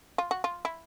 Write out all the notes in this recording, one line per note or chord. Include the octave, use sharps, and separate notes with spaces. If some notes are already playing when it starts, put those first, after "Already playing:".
F4
F#4
F4
E4